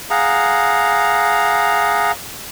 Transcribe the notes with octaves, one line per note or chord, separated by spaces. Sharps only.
G#4 F5 F#5 A#5